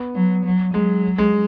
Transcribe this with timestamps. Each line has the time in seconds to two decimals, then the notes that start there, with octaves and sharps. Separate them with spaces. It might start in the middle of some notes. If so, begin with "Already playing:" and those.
Already playing: B3
0.15 F#3
0.45 F#3
0.74 F#3 G#3
1.18 G#3